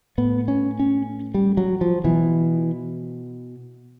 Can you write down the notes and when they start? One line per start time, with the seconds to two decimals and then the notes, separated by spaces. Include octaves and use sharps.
0.18 A2 B3
0.48 C#4
0.79 C#4
1.34 G3
1.57 F#3
1.81 F3
2.04 B2 E3